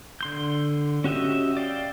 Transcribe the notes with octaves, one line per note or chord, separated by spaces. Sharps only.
D3 C6 G6
C#4 F#4 G4 D#5 E5
D5 F5 G5